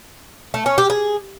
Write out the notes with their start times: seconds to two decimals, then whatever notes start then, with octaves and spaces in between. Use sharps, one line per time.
0.54 A3
0.66 C#4
0.78 G4
0.90 G#4